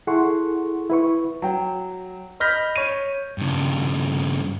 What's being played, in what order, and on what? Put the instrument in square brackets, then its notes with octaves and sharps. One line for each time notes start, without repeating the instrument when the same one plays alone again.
[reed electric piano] E4 G#4 A4 F#5 C6 C#6
E4 B4 C#6
[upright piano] F#3 G5
D#5 B5 F6 G6 A#6 B6
C#5 D#7
[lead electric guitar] G2 C#3